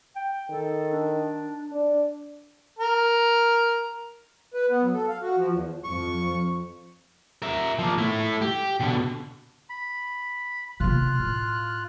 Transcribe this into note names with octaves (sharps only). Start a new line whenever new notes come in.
G5
D#3 A4
D4
D4
A#4
B4
B3
F#3
A4
F5
F#4
F3
E2
F2 F3 C#6
A#4 E5
F3 A#3
A3 E4
G4
B2 D3
B5
C3 A#3 F4 F6 F#6
A2